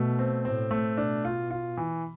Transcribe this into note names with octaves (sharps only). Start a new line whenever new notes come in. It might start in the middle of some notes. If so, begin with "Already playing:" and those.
Already playing: B2 A3
C4
A2 C4
A3
B2 D4
F4
F4
E3